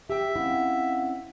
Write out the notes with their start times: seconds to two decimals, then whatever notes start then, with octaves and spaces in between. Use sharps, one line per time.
0.10 G4 E5 G5
0.36 C4 C#4 E4 F5 F#5